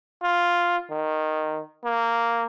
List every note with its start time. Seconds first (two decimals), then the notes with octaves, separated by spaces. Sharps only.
0.23 F4
0.90 D#3
1.85 A#3